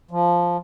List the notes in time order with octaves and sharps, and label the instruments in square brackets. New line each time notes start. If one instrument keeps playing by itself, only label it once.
[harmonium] F3